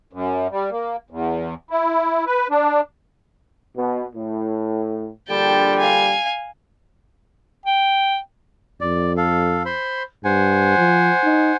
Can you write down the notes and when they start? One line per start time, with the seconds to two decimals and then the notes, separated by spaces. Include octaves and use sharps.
0.13 F#2
0.51 G3
0.71 A#3
1.10 E2
1.71 E4
2.27 B4
2.50 D4
3.77 B2
4.15 A2
5.28 A#1 D3 G3 G5 A5
5.78 F5 G#5
7.66 G5
8.81 F2 D5
9.17 A4 F5
9.65 C5 B5 C6
10.25 G2 C5 F#5 G#5
10.78 F3
11.24 D#4